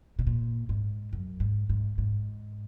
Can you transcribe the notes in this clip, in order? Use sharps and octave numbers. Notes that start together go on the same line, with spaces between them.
B2
A#2
G#2
F#2
G#2
G#2
G#2